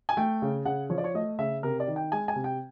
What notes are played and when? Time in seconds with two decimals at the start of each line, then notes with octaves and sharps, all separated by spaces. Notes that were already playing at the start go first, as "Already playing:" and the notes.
0.09 G#5
0.17 A3 G5
0.42 C#3
0.65 C#3 F#5
0.90 F3 C#5
0.98 D5
1.04 C#5
1.14 A3 D#5
1.38 C#3 E5
1.63 C3 A#4
1.80 D5
1.87 D#3
1.96 G5
2.12 G#3 G#5
2.28 G#5
2.36 C3
2.44 G5